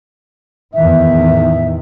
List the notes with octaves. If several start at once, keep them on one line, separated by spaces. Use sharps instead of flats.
E2 A2 D#3 E5